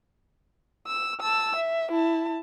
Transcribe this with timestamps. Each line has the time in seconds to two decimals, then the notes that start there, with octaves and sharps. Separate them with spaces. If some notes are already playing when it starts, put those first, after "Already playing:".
0.87 E6
1.21 A5 E6
1.56 E5
1.92 E4 A5